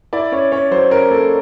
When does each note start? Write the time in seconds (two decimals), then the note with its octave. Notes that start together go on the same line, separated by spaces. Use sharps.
0.13 E4 D5
0.32 C#4 C#5
0.52 C#4 C#5
0.71 F#3 C5
0.91 C#4 A#4
1.10 A#3 A4